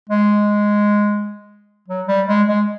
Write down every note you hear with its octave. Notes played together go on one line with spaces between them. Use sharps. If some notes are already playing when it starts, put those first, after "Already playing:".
G#3
F#3
G3
G#3
G#3